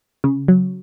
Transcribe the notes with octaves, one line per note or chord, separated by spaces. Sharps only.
C#3
F#3